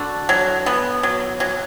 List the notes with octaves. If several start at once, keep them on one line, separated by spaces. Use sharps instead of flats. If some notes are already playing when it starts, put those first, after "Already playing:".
Already playing: D3 F#4
F#3
B3
F#3
F#3